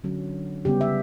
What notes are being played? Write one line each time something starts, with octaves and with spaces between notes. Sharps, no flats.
D3 F#3 C#4
C#3 G3 B3 G4
E5